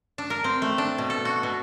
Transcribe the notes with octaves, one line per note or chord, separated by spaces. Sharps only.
D4
A#4
C4
A3
D4
B2
A4
F#4
B2